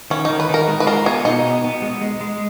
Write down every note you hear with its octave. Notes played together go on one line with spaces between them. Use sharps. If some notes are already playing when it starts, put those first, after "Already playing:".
D#3 C#4
D#3 D#4
B4
D#3 A#4
G#3
B4
F4 A#4
B3 G#4
B2 D#4
B3
B3
G#3
G#3
G#3